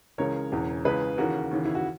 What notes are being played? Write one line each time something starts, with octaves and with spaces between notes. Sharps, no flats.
C#2 C#3 E3 A#4 C#5
E1 E2 C#3 E3
C#2 C#3 E3 G#4 B4
D#2 C#3 E3 F#4 A#4
D#2 C#3 E3
E4
F#4